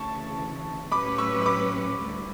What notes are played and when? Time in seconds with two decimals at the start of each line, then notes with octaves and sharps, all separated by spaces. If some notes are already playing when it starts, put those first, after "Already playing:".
Already playing: D2 C#3 E3 A5 C#6
0.92 A2 F#3 C#4 G4 B4 B5 D6
1.18 C#6 E6
1.42 E6
1.46 B5 D6
2.00 D2 D3 G3